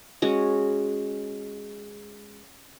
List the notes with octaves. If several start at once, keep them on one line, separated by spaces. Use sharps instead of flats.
G#3 C#4 F#4